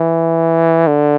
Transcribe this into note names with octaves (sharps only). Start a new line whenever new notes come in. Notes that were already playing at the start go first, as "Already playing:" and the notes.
Already playing: E3
D3